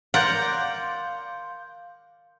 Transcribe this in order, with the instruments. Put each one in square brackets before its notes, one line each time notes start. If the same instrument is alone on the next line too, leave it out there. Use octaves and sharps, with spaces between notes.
[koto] A#4 D5 [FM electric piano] F5 C6 G6 [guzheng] F#5